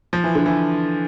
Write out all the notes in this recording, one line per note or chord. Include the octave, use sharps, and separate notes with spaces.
F3
E3
D3
E3